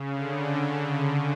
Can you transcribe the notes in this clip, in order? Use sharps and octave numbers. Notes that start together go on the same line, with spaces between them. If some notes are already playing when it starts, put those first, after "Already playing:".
Already playing: C#3
D3